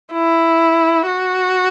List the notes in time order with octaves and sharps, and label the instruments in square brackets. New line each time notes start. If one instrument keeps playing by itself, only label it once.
[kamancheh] E4
F#4